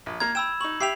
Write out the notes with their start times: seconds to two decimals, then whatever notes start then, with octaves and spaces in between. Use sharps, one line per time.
0.06 A#1
0.20 A#3 A#5 G#6
0.35 G5 B5 E6 E7
0.61 D#4 C#6 F#7
0.81 G4 E5 G5 C7 F7